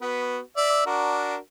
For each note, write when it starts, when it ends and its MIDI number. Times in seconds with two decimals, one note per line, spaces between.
0.01 0.39 59
0.01 0.39 66
0.01 0.39 71
0.57 0.83 74
0.57 0.83 76
0.86 1.37 62
0.86 1.37 66
0.86 1.37 70